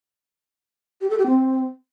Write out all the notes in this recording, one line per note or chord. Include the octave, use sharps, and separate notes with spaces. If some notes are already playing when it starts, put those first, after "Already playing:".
G4
A4
G4
C4